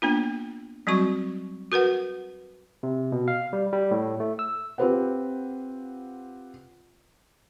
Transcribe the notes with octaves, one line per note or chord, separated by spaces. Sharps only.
A#3 B3 D4 F4
F#3 G3 C4 F#4 C#6
F#4 A#4 B4 F#5
C3
B2
F5
G3
G3
A2
A3
E6
C4 F4 G4 B4 C5 F#5